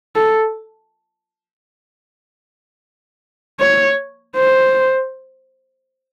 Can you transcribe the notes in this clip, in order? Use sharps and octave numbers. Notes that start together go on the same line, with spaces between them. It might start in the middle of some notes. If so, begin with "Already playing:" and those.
A4
C#5
C5